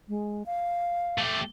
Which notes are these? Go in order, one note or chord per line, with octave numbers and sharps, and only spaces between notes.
G#3
F5
A3 G4